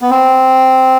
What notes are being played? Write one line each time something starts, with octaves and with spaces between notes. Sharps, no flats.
B3
C4